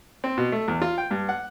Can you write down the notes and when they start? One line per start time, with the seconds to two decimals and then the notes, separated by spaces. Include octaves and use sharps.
0.24 C4
0.38 B2
0.52 A3
0.68 E2
0.82 F4
0.98 G5
1.11 G2
1.29 F#5